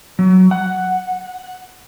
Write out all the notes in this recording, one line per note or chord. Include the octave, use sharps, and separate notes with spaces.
F#3
F#5